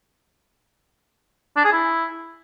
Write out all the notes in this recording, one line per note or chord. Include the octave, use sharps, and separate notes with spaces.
D4
G#4
E4